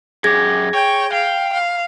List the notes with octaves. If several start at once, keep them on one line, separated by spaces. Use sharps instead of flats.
F#2 G4 G#4 G#6 A#6
C#5 G5
F5 G5
F5